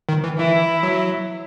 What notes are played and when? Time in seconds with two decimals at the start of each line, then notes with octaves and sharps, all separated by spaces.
0.09 D#3
0.24 E3
0.38 E3 E4
0.83 F#3